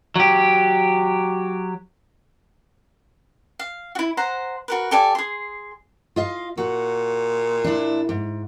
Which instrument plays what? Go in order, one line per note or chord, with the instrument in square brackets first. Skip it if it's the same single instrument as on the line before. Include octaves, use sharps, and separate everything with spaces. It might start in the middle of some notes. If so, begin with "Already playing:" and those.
[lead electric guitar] F#3 G4
[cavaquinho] F5
E4 F#4
C5 F#5 A#5
F#4 A#4 B4
G4 A4 D5 G#5
G#4 C6
[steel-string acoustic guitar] F4 D#5 F5
[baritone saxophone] A#2 [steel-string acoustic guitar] F#4
[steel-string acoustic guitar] D4 E4
G#2